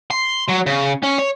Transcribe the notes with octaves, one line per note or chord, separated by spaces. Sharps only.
C6
F#3
C#3
C#4
C#5